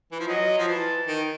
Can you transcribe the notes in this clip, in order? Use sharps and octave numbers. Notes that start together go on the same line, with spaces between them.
E3
F3
F#3 D#5
F3
E3 A5
D#3